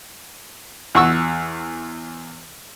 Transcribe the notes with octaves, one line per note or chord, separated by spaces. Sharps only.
E2 F#5 C#6 E6